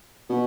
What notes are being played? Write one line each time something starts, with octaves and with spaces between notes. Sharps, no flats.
B2